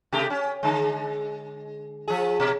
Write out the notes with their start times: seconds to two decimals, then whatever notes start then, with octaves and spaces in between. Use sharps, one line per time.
0.12 C3 A3 G4
0.30 C#4
0.63 D3 G#3
2.08 F3 G#4
2.40 B2